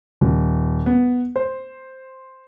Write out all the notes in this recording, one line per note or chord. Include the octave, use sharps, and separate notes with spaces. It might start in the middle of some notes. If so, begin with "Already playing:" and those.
D#1
B3
C5